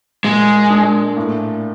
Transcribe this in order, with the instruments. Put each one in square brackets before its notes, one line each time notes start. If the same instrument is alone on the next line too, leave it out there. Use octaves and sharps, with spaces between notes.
[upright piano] A#2 [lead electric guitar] G#3
[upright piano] D4
A2